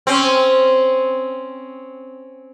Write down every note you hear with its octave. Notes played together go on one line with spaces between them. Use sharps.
C4 C#4